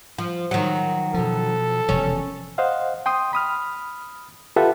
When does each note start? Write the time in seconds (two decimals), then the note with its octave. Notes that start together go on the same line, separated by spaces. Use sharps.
0.18 F3
0.51 D#3 F#3
1.14 B2 F3 A4
1.89 E1 C3 F3 C#4
2.58 C5 D#5 F5 F#5
3.06 G5 C6 D#6
3.33 B5 D#6 F6
4.56 F4 G4 A4 B4 E5 F#5